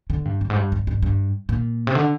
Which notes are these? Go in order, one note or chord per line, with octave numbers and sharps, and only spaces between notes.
D3
G2
G2
G#2
G2
G2
G2
G2
A#2
C3
D3